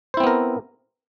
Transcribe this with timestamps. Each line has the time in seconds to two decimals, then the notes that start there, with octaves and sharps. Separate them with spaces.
0.14 C5
0.17 E4
0.20 C4
0.23 B3
0.27 A#4